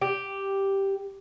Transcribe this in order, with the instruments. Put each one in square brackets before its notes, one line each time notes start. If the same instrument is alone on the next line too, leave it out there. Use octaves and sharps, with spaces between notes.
[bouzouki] G4